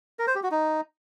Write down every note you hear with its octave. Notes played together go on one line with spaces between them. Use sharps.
A#4
C5
G4
F#4
D#4